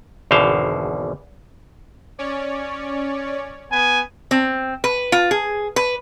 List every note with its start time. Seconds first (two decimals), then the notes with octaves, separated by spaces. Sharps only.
0.31 G#1 E2 B2 D3 C5 F5
2.18 C#4 C#5 D5
3.72 B3 G#5
4.31 C4
4.84 B4
5.12 F4
5.31 G#4
5.76 B4